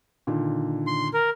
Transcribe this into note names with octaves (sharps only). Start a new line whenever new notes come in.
A#2 D3 D#3
C6
A#4